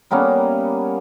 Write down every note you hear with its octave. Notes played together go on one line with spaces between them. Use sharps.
G3 A#3 B3 C#4